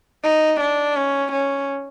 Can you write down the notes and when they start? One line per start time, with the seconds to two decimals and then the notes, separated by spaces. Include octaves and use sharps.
0.24 D#4
0.60 D4
0.96 C#4
1.32 C#4